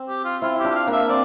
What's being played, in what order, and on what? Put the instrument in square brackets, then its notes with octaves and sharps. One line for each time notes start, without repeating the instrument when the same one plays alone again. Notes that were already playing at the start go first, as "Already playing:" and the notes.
Already playing: [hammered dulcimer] C4
[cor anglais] G4
F4
[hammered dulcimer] C4 E4 [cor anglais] F4
[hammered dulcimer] E4 [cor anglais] G4
[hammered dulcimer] D4 F4
[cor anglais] F5
[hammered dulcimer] A#3 D4
[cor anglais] E5
[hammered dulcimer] C4 [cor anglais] D5